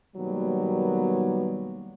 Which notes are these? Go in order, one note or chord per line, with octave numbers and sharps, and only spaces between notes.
B2 D#3 F#3 G3 A#3 B3